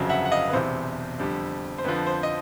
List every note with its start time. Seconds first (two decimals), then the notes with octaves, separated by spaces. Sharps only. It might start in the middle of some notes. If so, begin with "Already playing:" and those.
Already playing: G1 F2 C#3 F#3
0.09 E5 F#5
0.25 F#5
0.31 D#5 F5
0.49 B4
0.53 E1 E2 C3 C5
1.19 F2 D3 G3
1.78 C5
1.84 F2 D3 F3 B4
2.07 C5
2.23 D#5